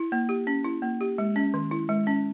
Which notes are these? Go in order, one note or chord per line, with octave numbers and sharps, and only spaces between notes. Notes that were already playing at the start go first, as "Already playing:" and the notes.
Already playing: E4
A#3
G4
C#4
E4
A#3
G4
G#3
C#4
D#3
E4
G#3
C#4